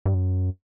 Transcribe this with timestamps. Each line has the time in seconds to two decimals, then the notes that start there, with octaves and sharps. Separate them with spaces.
0.06 G2
0.14 F#2